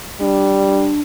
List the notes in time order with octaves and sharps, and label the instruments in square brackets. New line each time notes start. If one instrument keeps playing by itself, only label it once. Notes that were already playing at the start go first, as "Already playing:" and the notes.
[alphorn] G3 [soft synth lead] D4